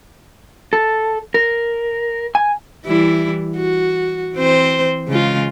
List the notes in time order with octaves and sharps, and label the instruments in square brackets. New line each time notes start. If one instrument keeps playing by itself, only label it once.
[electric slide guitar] A4
A#4
G#5
[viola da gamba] E3 G3 E4
F#4
E3 C4 C5
C#3 G#3 F4